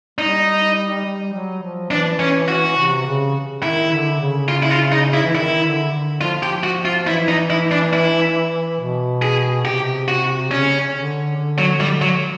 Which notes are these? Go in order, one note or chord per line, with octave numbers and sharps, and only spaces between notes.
G3 D#4
G3
F#3
F3
E3 D4
C#4
F#4
C3
C#3
D#3 E4
D3
C#3
F4
E4
F4
D#4
E4
E3
D#3 E4
D3
D3
F3 F4
G4
F#4
F4
E3 E4
D#4
E4
D4
E4
B2
G#4
C3 G4
F#4
C#3 C#4
D3
D3
F#3
G3
F#3